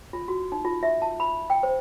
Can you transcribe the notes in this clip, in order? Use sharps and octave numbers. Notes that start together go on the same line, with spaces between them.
F4
F#4
D#4
F4
E5
A5
B5
G5
C5